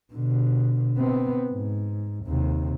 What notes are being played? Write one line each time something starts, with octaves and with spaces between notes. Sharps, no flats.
B2 D3
B3 C4
G#2
D#2 C3